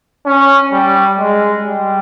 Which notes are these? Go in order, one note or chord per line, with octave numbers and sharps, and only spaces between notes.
C#4
G3
G#3
G3